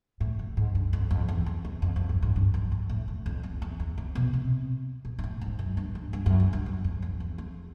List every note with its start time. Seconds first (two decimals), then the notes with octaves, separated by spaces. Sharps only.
0.20 A2
0.39 A2
0.57 G#2
0.75 G2
0.93 F2
1.11 F2
1.28 E2
1.46 F2
1.65 E2
1.82 F2
1.96 F2
2.09 G2
2.22 G#2
2.36 G2
2.54 F#2
2.72 F2
2.90 A2
3.08 A2
3.26 F2
3.43 F2
3.62 E2
3.80 E2
3.98 F2
4.15 B2
4.33 C3
5.05 A#2
5.19 G#2
5.24 A2
5.41 G#2
5.59 F#2
5.77 G2
5.95 G2
6.13 G2
6.26 F#2
6.40 G2
6.53 G2
6.66 F#2
6.84 F2
7.02 F2
7.20 E2
7.38 F2